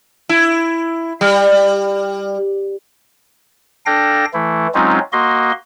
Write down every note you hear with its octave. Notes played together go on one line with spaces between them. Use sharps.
E4
G3
D4 A4 F5 G5 A#6
E3 A3 E4
F#3 G#3 C4 C#4 D#4 F4
A#3 F#4 D#5 C6